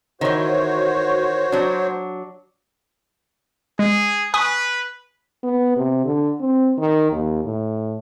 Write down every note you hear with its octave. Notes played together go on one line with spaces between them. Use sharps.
D#3 E3 F#4 C5 C#5
F#3 D4
G#3 G#4
B4 G#5 C#6 D#6
B3
C3
D3
C4
D#3
D#2
A2